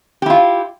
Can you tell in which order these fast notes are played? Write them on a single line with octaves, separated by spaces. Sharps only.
G4 E4 F4